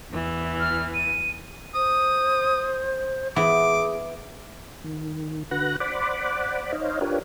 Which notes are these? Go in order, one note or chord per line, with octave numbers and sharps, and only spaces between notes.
E2 E3
F6
D#7
C5 D#6
E3 B3 E4 G#4 D6
D#3
D3 F#4 B4 F#5 F#6 A#6
C5 D5 F#5 B5 D6
D#4 C5 C#5 D#5 F5
D4 F4 G4 A#4 B4 C#5